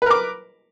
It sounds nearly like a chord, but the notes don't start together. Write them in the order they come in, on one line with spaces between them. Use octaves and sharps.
B4 A#4 D6